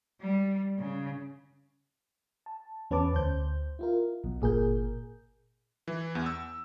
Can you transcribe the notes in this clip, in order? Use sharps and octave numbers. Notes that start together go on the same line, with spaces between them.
G3
C#3
A5
E2 C#4 B4 A5 D6
D2 C5 G6
E4 F4 A#4
B1 B2
G1 A#2 G#4 A#4 G6
E3
E2
E6